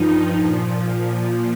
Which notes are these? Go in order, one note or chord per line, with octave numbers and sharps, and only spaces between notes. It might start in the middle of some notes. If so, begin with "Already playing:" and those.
Already playing: G2 F3 D#4
A#2 F3